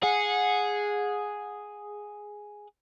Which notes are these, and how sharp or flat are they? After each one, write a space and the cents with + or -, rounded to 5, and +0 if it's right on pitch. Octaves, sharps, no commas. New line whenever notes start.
G#4 +0 F#5 -25